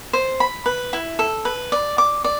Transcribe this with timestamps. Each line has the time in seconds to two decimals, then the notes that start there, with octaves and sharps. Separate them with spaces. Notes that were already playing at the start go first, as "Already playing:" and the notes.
0.13 C5
0.40 B5
0.66 B4
0.93 E4
1.19 A4
1.45 B4
1.72 D5
1.98 D6
2.24 D5